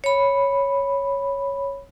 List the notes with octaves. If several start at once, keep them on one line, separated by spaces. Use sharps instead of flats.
C#5 B5